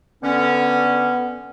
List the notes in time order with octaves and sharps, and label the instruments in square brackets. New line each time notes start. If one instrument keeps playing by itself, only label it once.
[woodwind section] D3 C#4 [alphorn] B3